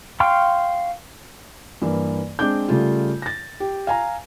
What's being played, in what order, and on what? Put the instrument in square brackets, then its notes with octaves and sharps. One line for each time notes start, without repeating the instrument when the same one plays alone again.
[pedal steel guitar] F5 G5 C6 C#6 F6
[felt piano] G2 E3 A#3
G#3 C4 D4 D6 G6
C#3 G3 A3 F4
A6 A#6
G4
F5 G#5 A#5